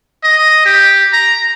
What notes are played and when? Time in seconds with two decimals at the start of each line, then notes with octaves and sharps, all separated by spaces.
0.24 D#5
0.65 G4
1.13 A#5